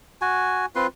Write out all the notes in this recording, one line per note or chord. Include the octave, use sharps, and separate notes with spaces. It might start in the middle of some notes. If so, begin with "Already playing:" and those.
F#4 G#5
C4 F4 B4 C6